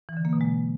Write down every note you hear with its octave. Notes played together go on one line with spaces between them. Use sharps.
E3
D3
A#3
B2
G#3